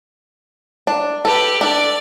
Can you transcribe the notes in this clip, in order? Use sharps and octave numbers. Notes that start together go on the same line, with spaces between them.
D4
G4 A4 B4
D4 A4 D5